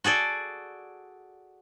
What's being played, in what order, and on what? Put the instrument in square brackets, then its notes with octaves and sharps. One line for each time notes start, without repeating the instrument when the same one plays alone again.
[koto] F#4 G#4 A4 D5